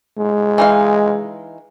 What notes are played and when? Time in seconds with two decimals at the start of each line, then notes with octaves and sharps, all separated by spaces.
0.18 G#3
0.58 E3 D#4 F5